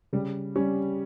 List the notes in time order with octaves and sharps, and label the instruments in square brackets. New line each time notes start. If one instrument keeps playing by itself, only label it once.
[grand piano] C#3 [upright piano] G3
[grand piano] G3 [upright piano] C#4